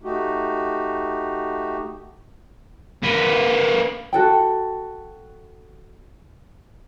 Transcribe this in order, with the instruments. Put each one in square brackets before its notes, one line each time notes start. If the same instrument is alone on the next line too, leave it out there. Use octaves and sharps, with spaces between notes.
[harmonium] A3 D#4 F#4 G4
[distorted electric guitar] A#3 B4
[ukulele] F#4 A4 G5